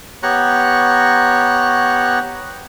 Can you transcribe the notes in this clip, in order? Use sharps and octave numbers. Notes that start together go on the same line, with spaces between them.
B3 G4 C#5 A#5 C#6 F#6